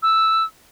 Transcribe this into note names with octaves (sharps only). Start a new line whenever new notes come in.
E6